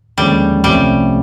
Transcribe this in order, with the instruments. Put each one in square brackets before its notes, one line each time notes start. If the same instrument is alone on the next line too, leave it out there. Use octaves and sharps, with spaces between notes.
[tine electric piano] D#2 D3 F3 G#3 C#4 [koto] G3
[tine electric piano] C2 C3 F3 A3 C#4 [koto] G3